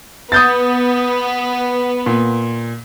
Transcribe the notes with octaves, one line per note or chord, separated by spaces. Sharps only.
B3 D#6 G6 A6
A#2